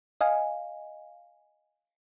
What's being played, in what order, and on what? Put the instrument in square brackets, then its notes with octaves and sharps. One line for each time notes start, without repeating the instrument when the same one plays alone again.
[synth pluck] D#5 F5 G#5